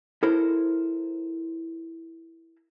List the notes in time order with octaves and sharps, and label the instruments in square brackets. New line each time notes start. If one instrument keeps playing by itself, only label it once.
[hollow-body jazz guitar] E4 A4 A#4 C5